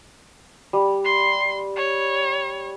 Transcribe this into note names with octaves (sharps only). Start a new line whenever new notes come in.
G3
C6
C#5